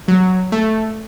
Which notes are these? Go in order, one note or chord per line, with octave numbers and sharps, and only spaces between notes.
F#3
A3